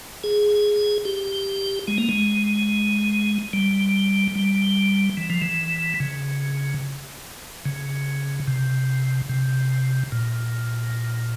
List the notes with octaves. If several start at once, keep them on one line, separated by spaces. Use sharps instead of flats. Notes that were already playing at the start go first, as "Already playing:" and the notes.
G#4
G4
G#3
A#3
G#3
G3
G3
E3
F3
E3
C#3
C#3
C3
C3
A#2